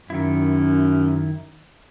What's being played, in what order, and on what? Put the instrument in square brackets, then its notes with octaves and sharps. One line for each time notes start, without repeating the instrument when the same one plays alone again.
[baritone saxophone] F#2 [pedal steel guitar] D#3 E4